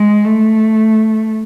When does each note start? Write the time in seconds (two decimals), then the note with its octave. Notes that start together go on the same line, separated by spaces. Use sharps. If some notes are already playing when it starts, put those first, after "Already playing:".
Already playing: G#3
0.24 A3